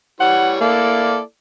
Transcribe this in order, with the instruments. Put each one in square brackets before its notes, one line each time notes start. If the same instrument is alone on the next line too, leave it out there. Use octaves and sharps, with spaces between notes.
[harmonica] E3 G3 C#5 [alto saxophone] F#5
[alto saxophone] A#3 [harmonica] E4 A4 D5